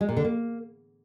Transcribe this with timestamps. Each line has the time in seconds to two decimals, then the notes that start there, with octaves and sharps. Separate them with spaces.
0.01 G#3
0.09 A#2
0.17 D3
0.25 A#3